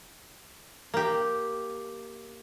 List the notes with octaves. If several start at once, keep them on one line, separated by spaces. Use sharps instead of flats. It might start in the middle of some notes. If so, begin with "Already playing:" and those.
A#3 G4